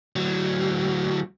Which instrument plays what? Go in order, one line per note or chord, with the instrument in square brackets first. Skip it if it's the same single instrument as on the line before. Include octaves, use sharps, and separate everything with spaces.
[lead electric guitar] D2 F#3